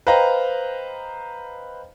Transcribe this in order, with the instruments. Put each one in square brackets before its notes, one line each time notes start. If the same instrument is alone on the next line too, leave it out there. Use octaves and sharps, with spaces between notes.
[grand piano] B4 C5 D#5 F5 G5 A#5